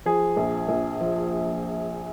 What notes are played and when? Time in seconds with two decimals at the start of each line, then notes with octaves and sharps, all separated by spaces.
0.06 F3 G#4
0.37 A#1
0.68 A#1
1.01 F3